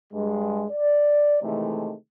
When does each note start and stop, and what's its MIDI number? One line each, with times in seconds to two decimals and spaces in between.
0.13 0.65 43
0.13 0.65 56
0.70 1.39 74
1.42 1.94 48
1.42 1.94 51
1.42 1.94 52
1.42 1.94 56
1.42 1.94 57